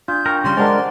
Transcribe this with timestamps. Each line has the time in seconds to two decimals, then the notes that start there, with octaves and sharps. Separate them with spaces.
0.08 D4 F4 G6
0.26 A#4 G5 C#6
0.44 C#3 G3 C6
0.57 G#3 D4 A#4 C5 D5 F#5